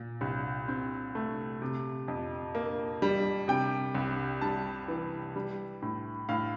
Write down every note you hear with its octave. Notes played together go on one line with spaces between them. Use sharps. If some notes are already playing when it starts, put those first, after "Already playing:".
Already playing: A#2
C2
C4
A3
C3
F2
A#3
G3
C3 G5
C2
G3 A5
E3
G3
A2
A2 F5